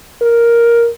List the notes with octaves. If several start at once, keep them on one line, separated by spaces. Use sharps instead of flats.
A#4